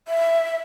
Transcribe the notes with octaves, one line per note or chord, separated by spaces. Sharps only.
E5